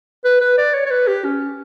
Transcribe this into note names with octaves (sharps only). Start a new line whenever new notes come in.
B4
B4
D5
C#5
C#5
B4
G4
C#4